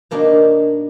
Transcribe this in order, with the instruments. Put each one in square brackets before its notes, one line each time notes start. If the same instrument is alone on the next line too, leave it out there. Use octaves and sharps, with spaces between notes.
[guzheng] B2 A#3 D4 D#4